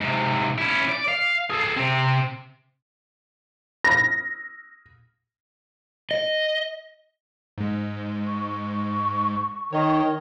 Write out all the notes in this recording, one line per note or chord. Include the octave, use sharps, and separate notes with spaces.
G#2 C3
C#4 E4
D5
F5
G#4 A4
C3 C4
A#6
D#5
G#2 G#3
C#6
D#3 C#5 D#5